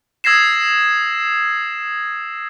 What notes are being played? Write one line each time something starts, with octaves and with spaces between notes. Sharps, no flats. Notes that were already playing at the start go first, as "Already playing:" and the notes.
D#6 E6 G#6 A#6 C7 E7